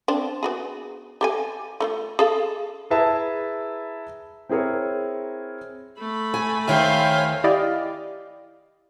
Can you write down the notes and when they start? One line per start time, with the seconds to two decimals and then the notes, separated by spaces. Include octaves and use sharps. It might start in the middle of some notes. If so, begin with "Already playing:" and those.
0.08 C4 D4
0.43 B3 F#4 G#4
1.21 G4 A4 G#5
1.80 A3 D#4 F4
2.19 G#4 A4 F5
2.90 E4 G#4 B4 E5 A5 A#5
4.49 C4 E4 G#4 A#4 C#5
5.98 A3 B5
6.34 G#5
6.68 D#2 D#3 C5 C#5 E5 F5 G5 G#5
7.44 E4 G4 D5 D#5 F5